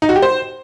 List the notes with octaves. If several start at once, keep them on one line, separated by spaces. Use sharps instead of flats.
D#4
F#4
G4
C5